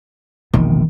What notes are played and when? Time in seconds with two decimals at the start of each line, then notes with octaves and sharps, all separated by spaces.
0.54 E1 A#1 C3 D#3